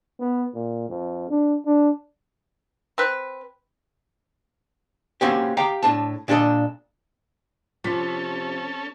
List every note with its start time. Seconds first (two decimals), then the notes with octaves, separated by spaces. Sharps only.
0.20 B3
0.54 A#2
0.89 F2
1.30 D4
1.66 D4
2.98 C4 B4
5.21 A#3 C4 C#4 F#4 G4
5.57 G4 F5 G5 A#5
5.83 A2 D4 A5
6.28 A#2 D4 G#4 A4 D#5
7.84 C3 F3 C#4 A4 B6